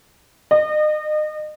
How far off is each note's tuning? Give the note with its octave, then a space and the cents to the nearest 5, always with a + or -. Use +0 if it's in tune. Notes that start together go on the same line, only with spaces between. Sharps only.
D#5 -30